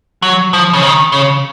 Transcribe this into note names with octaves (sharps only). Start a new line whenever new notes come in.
F#3
F3
C#3
D#3
C#3